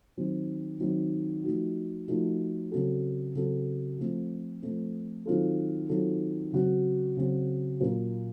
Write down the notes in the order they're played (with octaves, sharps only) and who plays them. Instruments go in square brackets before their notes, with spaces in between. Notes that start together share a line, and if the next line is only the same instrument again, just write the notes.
[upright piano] D#3 F#3 C4
D#3 F#3 C4
F3 A3 D#4 F#4
F3 A3 D#4 F#4
C#3 F#3 C4 F#4 A4
C#3 F#3 C4 F#4 A4
F3 A3 C4
F3 A3 C4
D#3 F#3 C4 F4 A4
D#3 F#3 C4 F4 A4
C#3 F#3 C4 F#4
C#3 F#3 C4 F#4
A#2 F#3 A#3 C#4